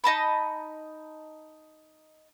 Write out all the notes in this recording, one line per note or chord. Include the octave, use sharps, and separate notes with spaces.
D#4 D#5 A5 B5